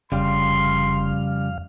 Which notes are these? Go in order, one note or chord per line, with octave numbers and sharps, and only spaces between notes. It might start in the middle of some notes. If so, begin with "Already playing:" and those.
F1 F2 C#3 G3 F5 C6